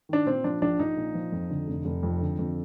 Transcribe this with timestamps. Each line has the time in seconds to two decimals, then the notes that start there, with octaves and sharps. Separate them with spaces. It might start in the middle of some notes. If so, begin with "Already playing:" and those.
0.09 D#3 D4
0.26 A#2 C4
0.44 F3 D4
0.62 A#1 D4
0.79 A#1 D#4
0.97 A#2
1.15 F3
1.32 F2
1.50 D3
1.68 F1
1.85 F1
2.03 F2
2.21 D3
2.39 F2